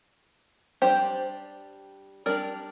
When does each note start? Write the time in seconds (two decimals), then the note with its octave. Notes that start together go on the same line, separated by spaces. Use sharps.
0.82 G3 D4 G4 C5
2.26 G3 D4 A#4 D5